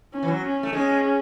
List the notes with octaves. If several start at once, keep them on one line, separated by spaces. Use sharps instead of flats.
C#4
E3
F#3
C#4
A3
G#3 C#4